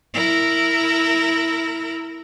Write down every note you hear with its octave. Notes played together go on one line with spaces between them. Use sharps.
E4 A#4